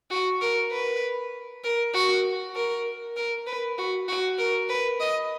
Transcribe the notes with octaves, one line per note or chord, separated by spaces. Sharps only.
F#4
A#4
B4
A#4
F#4
A#4
A#4
B4
F#4
F#4
A#4
B4
D#5